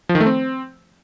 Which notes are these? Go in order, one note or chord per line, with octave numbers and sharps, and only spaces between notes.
F3
D#3
A3
C4